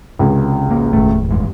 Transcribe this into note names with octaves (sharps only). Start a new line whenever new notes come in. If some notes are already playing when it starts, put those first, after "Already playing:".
C#2 C3 G#3
G#1 A#3
F1 D#2 A2 A3
E2 G2 G#3